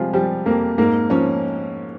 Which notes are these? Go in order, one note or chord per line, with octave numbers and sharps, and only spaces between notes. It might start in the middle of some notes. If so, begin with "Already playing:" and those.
Already playing: C3 F3 G3 G#3 F4 G#4
F3 G3 G4
F2 A#3 A#4
G#2 A#3 A#4
F3 C#4 C#5